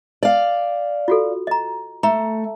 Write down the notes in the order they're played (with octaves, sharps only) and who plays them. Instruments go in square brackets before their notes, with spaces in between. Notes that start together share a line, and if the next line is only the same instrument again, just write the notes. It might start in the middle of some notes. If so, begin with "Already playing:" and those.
[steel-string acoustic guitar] D5 F5
[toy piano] F4 F#4 A4
D#5 A#5
[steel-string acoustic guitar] A3 [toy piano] A#5